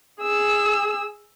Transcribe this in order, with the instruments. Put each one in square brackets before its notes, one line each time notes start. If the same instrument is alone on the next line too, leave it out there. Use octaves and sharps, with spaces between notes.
[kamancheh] G#4 E6